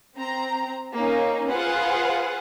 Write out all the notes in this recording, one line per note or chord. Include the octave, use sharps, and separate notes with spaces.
C4 A#5
A#3 C#4 D#4
F4 G#4 B4 C5 F5 F#5